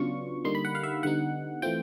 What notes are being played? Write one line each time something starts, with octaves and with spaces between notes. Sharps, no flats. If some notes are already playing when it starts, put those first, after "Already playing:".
Already playing: C#3 F#3 B3 D4 F4 C#6
D3 G3 A#3 D#4 C6
B5
F#5
F5
E5
D3 G3 B3 D#4 F#5
E3 A3 C4 F4 G5